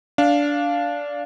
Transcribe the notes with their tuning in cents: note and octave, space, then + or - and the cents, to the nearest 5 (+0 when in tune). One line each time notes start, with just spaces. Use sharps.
D4 -15 F5 +0